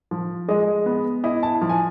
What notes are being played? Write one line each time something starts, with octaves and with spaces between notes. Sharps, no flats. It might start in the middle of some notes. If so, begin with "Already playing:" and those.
F3
G#3 D#5
B3
E4 D#5
A5
F3
G#5